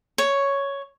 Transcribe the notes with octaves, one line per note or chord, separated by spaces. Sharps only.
C#5